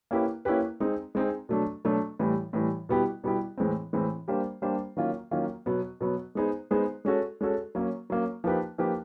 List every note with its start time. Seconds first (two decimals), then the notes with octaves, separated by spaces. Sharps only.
0.11 A#3 C#4 E4 G4 B4
0.45 A#3 C#4 E4 G4 B4
0.80 G#3 C4 D#4 G#4
1.15 G#3 C4 D#4 G#4
1.49 B2 F#3 A3 D4
1.85 B2 F#3 A3 D4
2.19 A2 E3 G3
2.53 A2 E3 G3
2.89 B2 G3 B3 E4 G4
3.24 B2 G3 B3 E4 G4
3.58 A2 E3 G#3 C4
3.93 A2 E3 G#3 C4
4.28 G3 A#3 D4 G4 C5
4.62 G3 A#3 D4 G4 C5
4.97 D#3 F#3 A#3 C#4 F4
5.31 D#3 F#3 A#3 C#4 F4
5.66 B2 F#3 B3
6.01 B2 F#3 B3
6.35 G#3 B3 D#4 G#4 C5
6.71 G#3 B3 D#4 G#4 C5
7.05 G#3 C#4 F#4 A4
7.41 G#3 C#4 F#4 A4
7.75 F#3 A#3 C#4
8.10 F#3 A#3 C#4
8.44 F3 A#3 D#4 G4 B4
8.78 F3 A#3 D#4 G4 B4